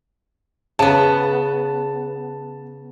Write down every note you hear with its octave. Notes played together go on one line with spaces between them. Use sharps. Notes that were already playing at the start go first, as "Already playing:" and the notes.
C#3 B3 A5